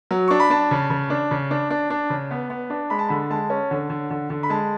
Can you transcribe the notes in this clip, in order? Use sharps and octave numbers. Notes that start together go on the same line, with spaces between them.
F#3
D4 C#6
B5
D4 A5
C#3
C#3
D4
C#3
D4
D4
D4
C#3
B3
B3
D4
G#3 B5
A5
D3 B5
G#3 A5
C#4
D3
D3
D3
D3
B5
G#3 A5